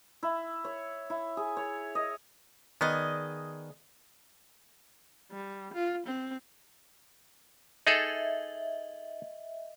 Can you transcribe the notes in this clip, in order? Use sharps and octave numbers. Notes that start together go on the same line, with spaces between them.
E4
C#5
E4
G#4
C#5
D#5
D#3 B3 G#4 D5 D#5
G3
F4
C4
D#4 G#4 A4 D#5 E5